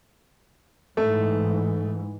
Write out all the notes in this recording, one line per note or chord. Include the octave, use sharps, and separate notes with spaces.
G#2 E3 A3